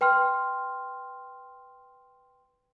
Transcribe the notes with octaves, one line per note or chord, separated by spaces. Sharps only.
B4 G5 C6 F6